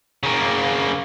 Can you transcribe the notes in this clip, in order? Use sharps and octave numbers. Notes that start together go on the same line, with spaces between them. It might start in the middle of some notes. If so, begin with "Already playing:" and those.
C#3 A#3